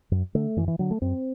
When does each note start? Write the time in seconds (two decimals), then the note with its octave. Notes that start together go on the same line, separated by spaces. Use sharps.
0.11 F#2
0.35 D3 A3
0.57 F#2 E3
0.68 E3
0.79 D3 F#3
0.91 A3
1.02 F#2 C4